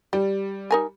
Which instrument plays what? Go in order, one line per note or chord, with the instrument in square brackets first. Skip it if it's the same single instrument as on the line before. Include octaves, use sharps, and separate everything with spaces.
[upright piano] G3 [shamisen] G4
[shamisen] D#4 A#4 G#5